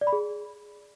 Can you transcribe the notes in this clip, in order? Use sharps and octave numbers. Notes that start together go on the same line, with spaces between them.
D5
B5
G#4